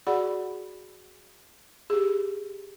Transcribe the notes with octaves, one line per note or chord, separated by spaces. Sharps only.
F#4 G#4 D5 F#5 B5
G4 G#4